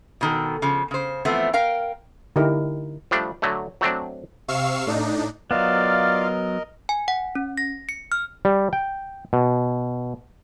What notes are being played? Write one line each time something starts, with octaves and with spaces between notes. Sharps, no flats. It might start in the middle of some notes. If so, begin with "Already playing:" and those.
B2 D#3 A4
C#3 F3
C#3 C5
E3 F3 A3 B3 C4
A#4 F5 G5
D3 D#4 E4 G4 A#4
F3 G3 A3 D4
D3 F#3 A3
F#3 A3 C4 D4
C3 F5 C#6 E6 C7
A2 D4 D#4
F#3 B3 F4 A#4 D5 D#5 F5
G#5
F#5
C#4
A#6
C#7
F6
G3
G5
B2